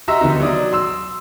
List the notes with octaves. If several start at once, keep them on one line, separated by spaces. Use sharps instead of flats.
F#4 D#5 E5 A#5 C6 E6
D3 D#3 B3 D#4
F#3 D5 D#6
C6 E6